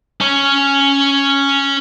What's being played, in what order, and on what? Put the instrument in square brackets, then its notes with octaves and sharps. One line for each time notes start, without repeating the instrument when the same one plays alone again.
[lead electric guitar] C#4 C#5